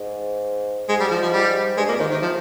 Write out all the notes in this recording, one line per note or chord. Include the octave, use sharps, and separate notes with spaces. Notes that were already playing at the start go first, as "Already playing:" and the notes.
Already playing: G#2
G#2 G#3
G3
F3
F3
G3
G2 G#3
F2 A#3
G#2 D#3
C3 D#3
C3 F3